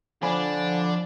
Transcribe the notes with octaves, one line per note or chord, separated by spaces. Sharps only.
D3 F3 D4 G#5 B5